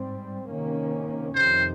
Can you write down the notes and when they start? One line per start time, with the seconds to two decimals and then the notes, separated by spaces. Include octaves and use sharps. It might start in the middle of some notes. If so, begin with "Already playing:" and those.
Already playing: G#2 G3 C4
0.49 C3 D#3 A#3 C#4
1.35 F2 C3 D#3 C5